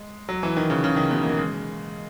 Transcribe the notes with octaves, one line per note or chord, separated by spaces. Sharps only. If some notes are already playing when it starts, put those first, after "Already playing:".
Already playing: G#3
F#3
E3
D#3
C#3
C#3
D#3
B2
A#3
G#3